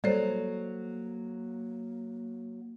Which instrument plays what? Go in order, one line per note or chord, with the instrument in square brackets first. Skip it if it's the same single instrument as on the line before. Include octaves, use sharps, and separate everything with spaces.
[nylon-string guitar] F#3 [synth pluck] G3 [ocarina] A#3 [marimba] A4 C5